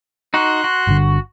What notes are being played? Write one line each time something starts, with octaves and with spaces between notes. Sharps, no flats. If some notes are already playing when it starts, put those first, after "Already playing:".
D#4 F#4 C6 F#6
F#4
G1 D3